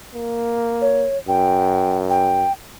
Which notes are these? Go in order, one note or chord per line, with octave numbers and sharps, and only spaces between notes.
A#3
C#5
F#2 G5
G5